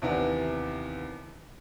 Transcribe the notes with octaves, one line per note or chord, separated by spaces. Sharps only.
D#2 C3 E3 B3 D4